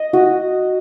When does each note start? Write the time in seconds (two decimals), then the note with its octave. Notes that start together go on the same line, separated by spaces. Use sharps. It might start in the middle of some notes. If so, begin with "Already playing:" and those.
Already playing: D#5
0.13 F#4